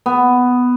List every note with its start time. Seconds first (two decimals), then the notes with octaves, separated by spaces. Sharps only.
0.06 B3